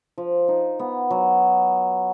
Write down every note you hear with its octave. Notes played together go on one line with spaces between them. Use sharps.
F3
D#4
B3
F#3